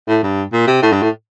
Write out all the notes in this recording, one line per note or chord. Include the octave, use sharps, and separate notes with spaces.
A2
G2
A#2
C3
A2
G2
A2